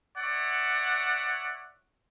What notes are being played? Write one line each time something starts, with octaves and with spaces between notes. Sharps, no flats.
C#5 D5 E5 F#5